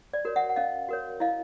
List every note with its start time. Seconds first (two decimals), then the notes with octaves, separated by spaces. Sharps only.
0.13 D5
0.25 F#4 A#4 C#5
0.36 E5 F#5
0.49 F#5
0.56 C#4 D#5 F5
0.89 F#4 A#4 C#5
1.20 E4 D#5 F5